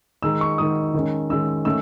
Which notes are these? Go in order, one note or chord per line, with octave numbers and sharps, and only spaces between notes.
D#3 G#3 D#4 E6
C#6
D#3 G#3 D#4 D#6
D#3 G#3 C#4
D#3 G#3 C#4 E6
D#3 A3 C#4 E6